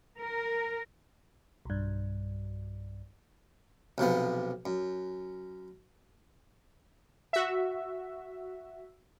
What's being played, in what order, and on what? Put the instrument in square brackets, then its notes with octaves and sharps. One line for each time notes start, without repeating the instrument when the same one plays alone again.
[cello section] A#4
[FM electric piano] B1 G2
[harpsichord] B1 C3 F3 B3
F#2
[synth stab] F#4 E5